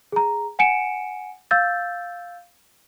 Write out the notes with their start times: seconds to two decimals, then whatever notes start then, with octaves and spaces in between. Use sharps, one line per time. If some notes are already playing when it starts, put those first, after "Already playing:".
0.12 G#4 A#5
0.59 F#5 G#5 C#7 D7 E7
1.51 F5 E6 G6 A6